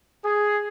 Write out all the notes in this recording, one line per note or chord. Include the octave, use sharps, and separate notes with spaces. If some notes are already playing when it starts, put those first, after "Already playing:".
G#4